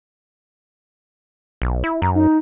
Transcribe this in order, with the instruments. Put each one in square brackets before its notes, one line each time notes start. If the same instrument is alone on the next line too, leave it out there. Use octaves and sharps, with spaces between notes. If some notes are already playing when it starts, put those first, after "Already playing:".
[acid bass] B1
E4
[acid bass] F#2 [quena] A#5
[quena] D#4